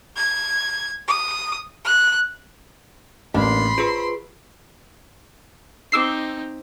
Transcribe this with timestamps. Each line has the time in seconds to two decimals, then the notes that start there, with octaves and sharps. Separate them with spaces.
0.16 G#6
1.08 D#6
1.84 F#6
3.34 A1 A#3 D4 B5 C6
3.78 F4 G#4 B4 C5 D7
5.92 C4 D#4 D6 E6 C7